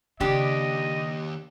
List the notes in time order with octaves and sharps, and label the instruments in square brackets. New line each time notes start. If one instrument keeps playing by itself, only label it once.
[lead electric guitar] D#2 [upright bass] C#3 [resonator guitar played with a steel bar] D4 G4 [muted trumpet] D#5